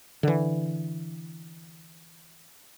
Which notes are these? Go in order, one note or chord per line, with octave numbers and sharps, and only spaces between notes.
D3 E3